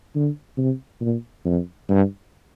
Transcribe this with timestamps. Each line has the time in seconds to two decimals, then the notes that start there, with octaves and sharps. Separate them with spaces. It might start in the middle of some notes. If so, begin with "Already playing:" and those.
0.15 D3
0.58 C3
1.01 A#2
1.45 F2
1.89 G2